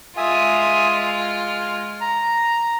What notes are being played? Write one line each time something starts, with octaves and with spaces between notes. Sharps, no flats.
G#3 F4 E5 G#5 D#6
F6
A#5